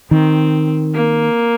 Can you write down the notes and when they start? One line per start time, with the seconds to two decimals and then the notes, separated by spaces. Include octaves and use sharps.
0.11 D#3 C4
0.94 A#3